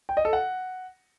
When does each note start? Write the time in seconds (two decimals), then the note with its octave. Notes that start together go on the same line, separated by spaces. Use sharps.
0.09 G5
0.17 D#5
0.25 A4
0.33 F#5